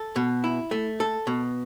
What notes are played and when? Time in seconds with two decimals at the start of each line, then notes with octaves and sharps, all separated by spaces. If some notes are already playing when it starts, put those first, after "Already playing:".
Already playing: A4
0.16 B2
0.44 E4
0.71 A3
1.00 A4
1.27 B2